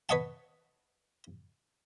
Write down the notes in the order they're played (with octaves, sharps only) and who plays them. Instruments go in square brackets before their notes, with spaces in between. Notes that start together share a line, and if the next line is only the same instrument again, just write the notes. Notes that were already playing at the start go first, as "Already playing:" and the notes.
[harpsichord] B4 C#5 D#5 F#5 A5